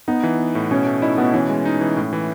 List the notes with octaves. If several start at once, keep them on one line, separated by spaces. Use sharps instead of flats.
B3 D#4
E3
B3
A2
B2 C#4
A3
D#4 E4
B2 B3
E3 C#4
G#3
D#4
E3
A2
E3